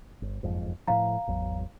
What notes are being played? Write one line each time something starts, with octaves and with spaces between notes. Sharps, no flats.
G1
F#1 F2 G#2
A2 F3 F5 A#5
G#1 E2 F#3